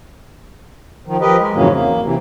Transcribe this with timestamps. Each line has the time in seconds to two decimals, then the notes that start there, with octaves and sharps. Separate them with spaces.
1.07 D#3 F3
1.21 F3 G4 A#4 B4 D#5
1.39 G#3
1.54 F2 G#2 C#3 E3 F#3 A#3
1.71 A#3
2.04 C3 E3